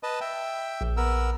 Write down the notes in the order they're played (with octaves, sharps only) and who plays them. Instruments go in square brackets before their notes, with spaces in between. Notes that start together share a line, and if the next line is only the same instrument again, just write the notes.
[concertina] B4 D#5 A5
E5 G5
[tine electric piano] A#1
[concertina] B3 A#4 E6